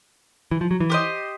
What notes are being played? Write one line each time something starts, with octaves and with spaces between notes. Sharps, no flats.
E3
F3
F#3
E3
G4 C5 D#5